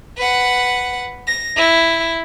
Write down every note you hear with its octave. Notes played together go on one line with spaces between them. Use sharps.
B4 F#5
A#6
E4